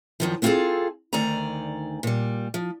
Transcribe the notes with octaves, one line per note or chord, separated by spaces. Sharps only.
F#2 D#3 F3
B3 C4 F4 F#4 G#4 A4
D2 D#3 D5 G#5 A#5
A#2 G3
F3